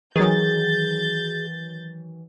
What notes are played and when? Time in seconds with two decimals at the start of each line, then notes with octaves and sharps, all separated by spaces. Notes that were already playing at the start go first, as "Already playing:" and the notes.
0.16 D#3 E3 F#3 G#4 G6 A6